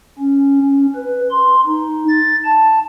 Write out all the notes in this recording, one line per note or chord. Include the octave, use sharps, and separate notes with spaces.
C#4
C#4
B4
C6
D#4
A6
A5